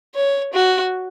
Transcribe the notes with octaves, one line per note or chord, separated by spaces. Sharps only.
C#5
F#4